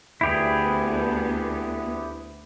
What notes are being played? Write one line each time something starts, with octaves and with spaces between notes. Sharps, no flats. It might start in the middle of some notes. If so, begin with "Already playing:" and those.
D2 B3 E4 G4 G#4